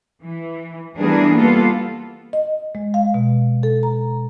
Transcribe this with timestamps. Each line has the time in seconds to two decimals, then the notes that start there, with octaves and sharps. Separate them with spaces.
0.23 E3
0.98 E3 G3 B3 D4 G#4 A#4
1.35 G3 A#3 B3 F4 A4
2.33 D#5
2.75 G#3
2.94 F5
3.14 B2
3.63 A4
3.83 A#5